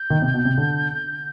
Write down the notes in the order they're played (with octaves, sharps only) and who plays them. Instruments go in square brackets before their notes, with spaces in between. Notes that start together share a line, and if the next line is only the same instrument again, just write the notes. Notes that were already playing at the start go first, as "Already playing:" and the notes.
Already playing: [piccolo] G6
[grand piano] D#3
C3
B2
C3
D3